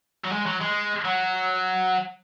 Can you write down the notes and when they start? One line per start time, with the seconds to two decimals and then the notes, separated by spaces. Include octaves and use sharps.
0.24 F#3
0.32 G#3
0.46 F#3
0.61 G#3
1.05 F#3